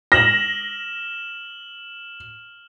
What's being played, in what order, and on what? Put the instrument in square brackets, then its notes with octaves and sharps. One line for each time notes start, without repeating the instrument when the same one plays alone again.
[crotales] F6 E7 F#7 [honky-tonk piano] A#6